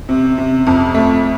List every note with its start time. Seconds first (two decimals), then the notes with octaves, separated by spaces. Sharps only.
0.09 C3
0.38 C3
0.67 F2
0.94 A3